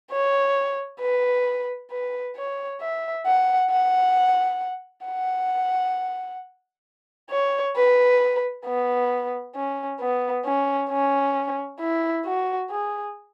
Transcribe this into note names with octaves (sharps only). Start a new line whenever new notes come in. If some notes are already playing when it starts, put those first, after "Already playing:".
C#5
B4
B4
C#5
E5
F#5
F#5
F#5
C#5
B4
B3
C#4
B3
C#4
C#4
E4
F#4
G#4